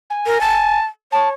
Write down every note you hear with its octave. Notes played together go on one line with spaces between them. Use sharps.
G#5
A#4
A5
C#5 A5